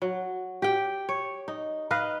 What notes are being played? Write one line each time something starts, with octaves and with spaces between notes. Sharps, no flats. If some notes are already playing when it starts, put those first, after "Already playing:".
F#3
G4 G5
C#5
D#4
D#4 B4 D#5 F5